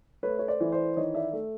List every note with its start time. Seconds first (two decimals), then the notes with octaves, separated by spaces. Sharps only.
0.23 A3 B4 C#5
0.39 C#5
0.48 C5 D5
0.60 E3
0.72 C5 D5
0.97 D#3 C#5 D#5
1.15 D5 E5
1.33 A3